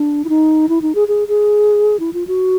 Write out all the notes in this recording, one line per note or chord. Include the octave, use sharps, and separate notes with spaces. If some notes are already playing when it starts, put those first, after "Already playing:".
Already playing: D4
E4
D#4
E4
D#4
G#4
G#4
G#4
E4
F4
F#4